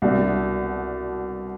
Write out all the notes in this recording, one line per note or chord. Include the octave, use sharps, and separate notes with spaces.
C2 B2 D4